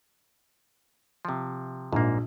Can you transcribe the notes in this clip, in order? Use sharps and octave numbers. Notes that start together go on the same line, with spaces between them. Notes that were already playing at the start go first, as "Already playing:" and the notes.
C3 F3
A#1 G#2 A#3